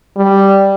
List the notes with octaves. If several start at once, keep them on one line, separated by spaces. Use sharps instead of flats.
G3